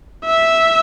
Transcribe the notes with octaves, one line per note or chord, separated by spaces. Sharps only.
E5